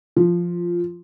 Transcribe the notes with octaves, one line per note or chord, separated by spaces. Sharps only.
F3